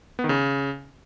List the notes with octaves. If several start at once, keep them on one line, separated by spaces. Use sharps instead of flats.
B3
D#3
C#3